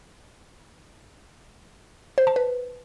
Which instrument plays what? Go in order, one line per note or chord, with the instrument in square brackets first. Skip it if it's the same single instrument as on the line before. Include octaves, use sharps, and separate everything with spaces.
[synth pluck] C5
A5
B4